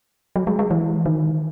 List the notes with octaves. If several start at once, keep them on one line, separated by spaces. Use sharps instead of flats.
F#3
G#3
G#3
E3
D#3